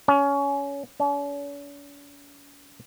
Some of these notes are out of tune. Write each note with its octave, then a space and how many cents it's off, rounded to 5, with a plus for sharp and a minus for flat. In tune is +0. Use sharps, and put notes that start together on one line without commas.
C#4 +20
C#4 +45